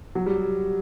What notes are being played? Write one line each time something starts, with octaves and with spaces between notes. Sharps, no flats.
F#3
G3